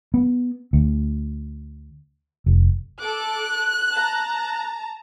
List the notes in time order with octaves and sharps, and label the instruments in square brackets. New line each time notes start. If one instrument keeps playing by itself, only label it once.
[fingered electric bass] B3
D2
F1
[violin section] A4 D6 [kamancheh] F#6
[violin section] A5 A#5